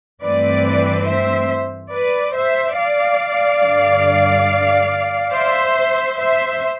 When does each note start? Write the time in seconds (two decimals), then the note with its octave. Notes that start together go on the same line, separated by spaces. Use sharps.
0.21 G2 E3 A3 C4 B4 D5
1.06 C5 E5
1.92 B4 D5
2.34 C5 E5
2.76 D5 F5
3.62 G2 D3 G3
5.32 C5 E5
6.17 C5 E5